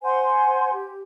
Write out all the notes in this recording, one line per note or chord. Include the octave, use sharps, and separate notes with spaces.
C5 F#5 G#5 C6
G4